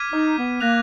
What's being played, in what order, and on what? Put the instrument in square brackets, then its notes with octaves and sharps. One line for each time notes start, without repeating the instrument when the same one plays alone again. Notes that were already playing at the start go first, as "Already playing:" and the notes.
Already playing: [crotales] D6 F6 G#6 B6 D#7
[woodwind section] D#4
B3
[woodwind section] A#3 [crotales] F#6 A#6 F7